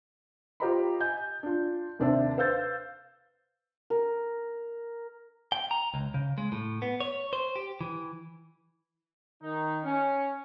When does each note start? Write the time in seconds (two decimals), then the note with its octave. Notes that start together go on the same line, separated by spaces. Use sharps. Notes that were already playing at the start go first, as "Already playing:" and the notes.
0.60 F4 G4 C5 D#5 A#5 B5
1.00 D#5 G#5 G6
1.43 D4 F4
1.99 D#2 C3 D4 C5 E5 A5
2.37 B4 C5 F5 E6 G6 A6
3.90 A#4
5.52 G5
5.71 A#5
5.94 C#2
6.14 C#3
6.38 G#3
6.52 A2
6.82 B3
7.00 C#5
7.33 C5
7.56 G4
7.81 E3
9.43 D#3 D#4
9.84 C#4